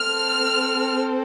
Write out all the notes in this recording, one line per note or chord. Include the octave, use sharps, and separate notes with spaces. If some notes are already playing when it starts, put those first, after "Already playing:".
Already playing: C4 A4 F6